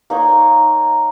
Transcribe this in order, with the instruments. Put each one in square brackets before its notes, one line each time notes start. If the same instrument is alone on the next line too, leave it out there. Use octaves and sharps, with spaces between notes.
[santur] A#3 D#4 A#4 C#5